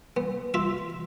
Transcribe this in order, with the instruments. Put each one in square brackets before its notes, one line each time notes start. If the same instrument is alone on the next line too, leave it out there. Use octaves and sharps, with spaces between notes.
[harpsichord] B3
F4 E5